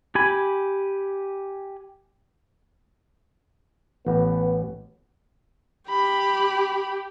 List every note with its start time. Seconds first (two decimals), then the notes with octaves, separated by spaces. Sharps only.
0.15 G4 G#5 B5
4.06 A1 B3
5.89 G4 B5